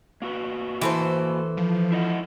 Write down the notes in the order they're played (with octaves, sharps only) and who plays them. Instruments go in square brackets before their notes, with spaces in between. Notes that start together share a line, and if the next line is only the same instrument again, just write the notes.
[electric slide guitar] A#3 F#4 B4
[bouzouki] E3 A4 C5
[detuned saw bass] F3
[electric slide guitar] E4 D#5 F#5